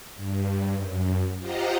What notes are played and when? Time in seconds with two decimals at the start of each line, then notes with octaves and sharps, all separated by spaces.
0.16 G2
0.75 F#2
1.39 F4 G4 C5 D#5 F#5 A#5